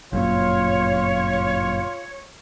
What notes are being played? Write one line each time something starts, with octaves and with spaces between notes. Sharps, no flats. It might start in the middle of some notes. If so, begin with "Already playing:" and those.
G1 F#2 A#2 F4 C#5